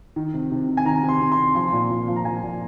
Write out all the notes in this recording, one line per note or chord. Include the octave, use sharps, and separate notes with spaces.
D#3
C3
C3
D#3
G#5
D#3 A#5
C3
C6
C3
C6
D#3
F3 C6
A#2
A#2
F3
A#5
F3 G#5
A#2